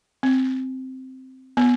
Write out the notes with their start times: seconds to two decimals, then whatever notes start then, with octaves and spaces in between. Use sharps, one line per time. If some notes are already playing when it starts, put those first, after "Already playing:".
0.23 C4
1.57 B3